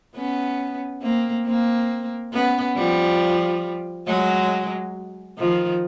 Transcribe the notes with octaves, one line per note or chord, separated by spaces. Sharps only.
B3 C#4
A#3 C4
A#3 C4
B3 C#4
F3 G3
F#3 G#3
D#3 F3